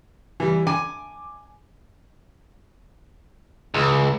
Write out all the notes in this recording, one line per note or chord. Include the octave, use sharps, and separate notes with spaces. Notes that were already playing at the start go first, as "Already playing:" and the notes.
E3 G3
G#5 D6
C#2